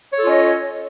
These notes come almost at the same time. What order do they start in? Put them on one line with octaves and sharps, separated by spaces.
C#5 A4 F4 C#4 D#5